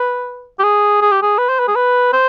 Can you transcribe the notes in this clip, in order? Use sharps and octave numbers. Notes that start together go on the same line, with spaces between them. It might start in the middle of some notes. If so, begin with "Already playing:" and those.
Already playing: B4
G4
G#4
G#4
G4
G#4
B4
C5
B4
G#4
B4
C5